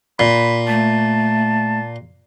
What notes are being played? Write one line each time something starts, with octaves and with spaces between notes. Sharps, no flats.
A#2 B5
A3 A5